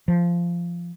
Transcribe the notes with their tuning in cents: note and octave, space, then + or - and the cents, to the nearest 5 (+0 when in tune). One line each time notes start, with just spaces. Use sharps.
F3 -15